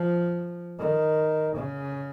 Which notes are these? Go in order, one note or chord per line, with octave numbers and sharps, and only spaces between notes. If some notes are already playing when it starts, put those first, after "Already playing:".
Already playing: F3
D#3
C#3